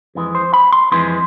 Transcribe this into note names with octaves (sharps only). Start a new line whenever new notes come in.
F2 E3 G#3
C5
B5
C6
F2 E3 G#3 C6